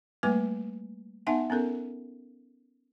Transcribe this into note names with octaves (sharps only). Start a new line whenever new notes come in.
G3 A3 A#3 B4 G#5 D6
B3 D#4 E5 F#5 G#5 A5
B3 C#4 A4 A#4